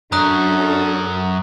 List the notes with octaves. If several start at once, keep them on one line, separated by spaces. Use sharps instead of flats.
F#2 C#4 D4 F#4 A4 A#5 D#6 F#6